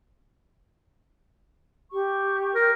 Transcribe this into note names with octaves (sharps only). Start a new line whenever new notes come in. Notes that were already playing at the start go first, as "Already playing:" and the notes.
G4 C#6
A#4